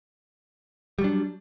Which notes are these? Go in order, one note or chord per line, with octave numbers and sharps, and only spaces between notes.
F#3 G3 D4